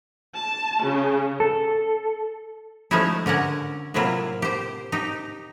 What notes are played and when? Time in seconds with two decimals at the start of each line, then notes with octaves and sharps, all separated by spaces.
0.39 A5
0.83 C#3
1.40 A4
2.91 F3 G#3 A3 C#4 D#4 E4
3.26 D3 C#4 A#4 F#5 G#5
3.94 A2 C3 F#3 A#3 E4 F4
4.42 G4 C5
4.92 D#4 G4